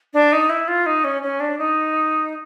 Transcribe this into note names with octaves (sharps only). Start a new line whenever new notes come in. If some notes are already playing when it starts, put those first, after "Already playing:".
D4
D#4
E4
F4
D#4
C#4
C#4
D4
D#4